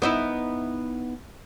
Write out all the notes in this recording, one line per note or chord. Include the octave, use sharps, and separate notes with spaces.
B3 D#4 E4